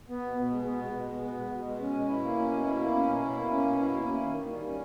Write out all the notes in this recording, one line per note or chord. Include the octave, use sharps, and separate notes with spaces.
B3
B2
B2
G#3
B3
B2
B2
G#3
B3
B2
B2
G#3
C#4
B2
E4
A#3
C#4
B2
E4
A#3
C#4
B2
E4
A#3
C#4
B2
E4
A#3
C#4
D#3
D#3
G3
C#4